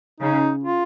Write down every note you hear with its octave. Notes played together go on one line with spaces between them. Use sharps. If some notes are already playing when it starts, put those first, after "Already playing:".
C#3 D#4
F4